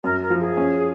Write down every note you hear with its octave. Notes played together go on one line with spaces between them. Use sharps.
F#2 A#4
A#4
F3
G#4
C#4